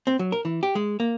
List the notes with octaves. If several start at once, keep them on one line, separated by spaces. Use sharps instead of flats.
C4
F#3
A#4
E3
G4
G#3
A#3